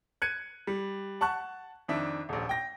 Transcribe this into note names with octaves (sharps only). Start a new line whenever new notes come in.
F#6 G#6 C#7 D#7
G3
F#5 A5 C#6 F#6
F2 D#3 D4 E5
D#1 A#1
G5 A#6